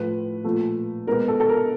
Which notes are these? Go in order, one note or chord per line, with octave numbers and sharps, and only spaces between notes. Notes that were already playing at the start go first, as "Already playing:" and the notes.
Already playing: A2 F3 A3 B4
A#2 F3 A3
B2 G#3 B3 A#4
A4
A4
A#4